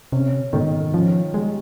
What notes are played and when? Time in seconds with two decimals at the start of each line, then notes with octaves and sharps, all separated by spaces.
0.12 C3 C#4
0.53 G#2 D#3
0.93 F3 C#4
1.34 G3 G#3